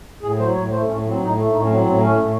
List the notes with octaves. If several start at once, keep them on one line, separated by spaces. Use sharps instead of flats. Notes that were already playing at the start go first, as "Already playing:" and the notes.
A2 G#4
F#3 C5
A2 C#5
A3 C5
A2 C#4
A3
F#3
C4
A2 D#4
A3
A2 D#4
C#4
F#3
C4
A2 C4
A3 C#4
A2